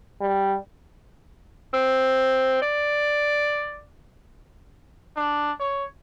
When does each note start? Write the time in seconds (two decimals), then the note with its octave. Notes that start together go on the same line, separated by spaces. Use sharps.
0.21 G3
1.73 C4
2.62 D5
5.16 D4
5.60 C#5